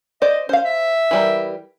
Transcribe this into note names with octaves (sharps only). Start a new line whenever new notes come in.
C5 D5 D#5
C#4 C5 F5
E5
E3 G3 A#4